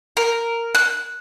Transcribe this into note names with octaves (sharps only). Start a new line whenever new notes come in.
A#4
F#6